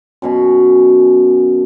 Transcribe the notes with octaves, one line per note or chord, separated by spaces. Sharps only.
F#2 B2 G#5